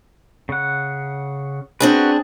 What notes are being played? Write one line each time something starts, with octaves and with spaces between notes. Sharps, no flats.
C#3 F#5
C4 D4 F#4 G#4 B4